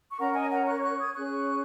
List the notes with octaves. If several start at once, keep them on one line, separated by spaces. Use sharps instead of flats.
C#6
C#4 A#4 C#5 F#5 A#5
D#5 G#5
F#5 A#5
C#6 F#6
G#6
C#6 F#6
D#6 G#6
C#4 G#4 C#5 C#6 F#6